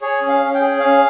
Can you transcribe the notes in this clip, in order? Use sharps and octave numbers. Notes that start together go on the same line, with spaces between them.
G#4 C#5
C#4
F5
C#4
G5
G#4
C#4 F5